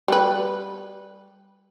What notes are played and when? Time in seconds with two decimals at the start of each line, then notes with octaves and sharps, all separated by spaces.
0.08 G3 B4